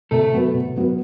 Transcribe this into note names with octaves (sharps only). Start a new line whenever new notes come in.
C3 A3 A4
F#3 B3 F#4 B4
C3
F#3 B3 F#4 B4